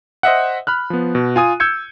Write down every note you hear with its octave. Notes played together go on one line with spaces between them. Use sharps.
C5 D#5 E5 F#5
B5 F6 F#6
F3 B3
B2
F4 G#5 D#6 D#7
E6 G6 G#6 C#7